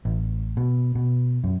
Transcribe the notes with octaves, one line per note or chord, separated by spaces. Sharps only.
A1
B2
B2
F#2